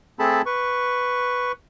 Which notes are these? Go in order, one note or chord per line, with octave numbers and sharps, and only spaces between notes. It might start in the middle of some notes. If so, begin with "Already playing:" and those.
A3 C4 G#4 A4 A5 B5
B4 C#6